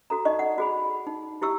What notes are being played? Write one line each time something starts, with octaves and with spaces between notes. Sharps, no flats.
F#4 A4 A#5
D#4 D5 D#5 C#6
F#5
F#4 G#4 B5
D#4
E4 G4 C#6 E6